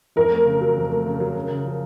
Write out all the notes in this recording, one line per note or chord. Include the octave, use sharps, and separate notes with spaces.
F2 A#4
A3
C#3
F#3
F2
A3
C#3
F#3
C#3
C#3
F3